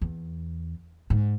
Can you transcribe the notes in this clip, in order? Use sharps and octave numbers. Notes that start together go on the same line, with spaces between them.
E2
G#2